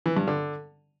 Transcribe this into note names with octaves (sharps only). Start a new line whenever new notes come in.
E3
G2
D3